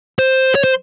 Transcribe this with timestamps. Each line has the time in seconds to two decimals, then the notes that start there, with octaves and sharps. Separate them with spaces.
0.19 C5
0.55 C#5
0.64 C5